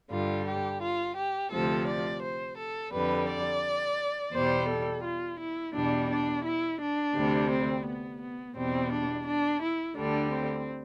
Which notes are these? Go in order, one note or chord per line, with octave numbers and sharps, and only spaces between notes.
G2 D3 G3 F4
G4
F4
G4
D2 C3 F3 A4
D5
C5
A4
F2 D3 G3 B4
D5
E2 B2 G3 C5
A4
F4
E4
E2 B2 G3 D4
D4
E4
D4
D2 C3 G3
C4
B3
B3
E2 B2 G3 C4
D4
D4
E4
D2 D3 G3 D4
C4